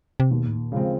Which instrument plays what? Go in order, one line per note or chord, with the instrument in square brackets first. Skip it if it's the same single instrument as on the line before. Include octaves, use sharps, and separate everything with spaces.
[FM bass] C3
[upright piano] D#2 [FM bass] B2
[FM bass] A2
A#2
[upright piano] C#3 F3 G#3 C4